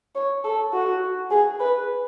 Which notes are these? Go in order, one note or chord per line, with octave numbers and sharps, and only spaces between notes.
C#5
A4
F#4
G#4
B4